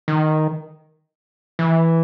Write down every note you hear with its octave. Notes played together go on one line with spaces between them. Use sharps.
D#3
E3